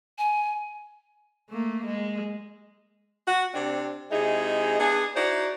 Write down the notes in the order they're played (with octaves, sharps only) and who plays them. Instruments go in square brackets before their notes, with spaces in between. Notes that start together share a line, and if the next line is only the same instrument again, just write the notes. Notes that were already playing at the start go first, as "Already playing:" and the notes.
[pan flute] G#5
[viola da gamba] A3 A#3
G#3
[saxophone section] F#4
C3 C4 D4
C3 G#3 D#4 E4 G#4
B3 D4 G#4
D#4 E4 F#4 C5 D5